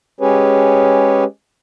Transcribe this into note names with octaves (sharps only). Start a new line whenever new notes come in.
G#3 C#4 G4 G#4 B4 C#5